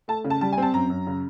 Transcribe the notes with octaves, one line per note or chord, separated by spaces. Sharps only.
A3 A5
C#3
A5
G3 A5
G#5
C4 A5
F#2 A#5
F#2
C#3